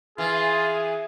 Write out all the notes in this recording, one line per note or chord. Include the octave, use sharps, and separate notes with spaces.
E3 F4 G#4